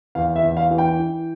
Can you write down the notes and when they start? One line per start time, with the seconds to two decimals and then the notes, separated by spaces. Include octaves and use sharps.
0.15 E2 F5
0.36 E5
0.43 E2
0.57 F5
0.71 E3
0.78 G5
0.99 E3